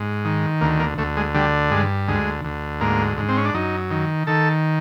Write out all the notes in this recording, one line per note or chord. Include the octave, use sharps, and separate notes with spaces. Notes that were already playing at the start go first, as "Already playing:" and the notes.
Already playing: G#2
D#3
D2 A#3
A#3
D2 A3
G#3
D3 G3
G2 G#3
D2 G#3
D2
G#2 A#3
G#2
C4
C#4
D4
F#2 D#4
D#3
D#3 A4